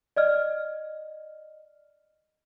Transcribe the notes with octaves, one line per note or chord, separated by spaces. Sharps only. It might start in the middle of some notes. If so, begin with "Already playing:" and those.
D5 D#5 F6